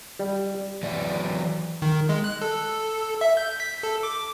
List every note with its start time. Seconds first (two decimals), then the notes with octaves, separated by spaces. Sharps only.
0.19 G3
0.83 E3 F#3 D5
1.82 D#3
2.09 G#3
2.24 F#6
2.42 A4
3.21 E5
3.37 G6
3.60 B6
3.83 A4
4.03 D6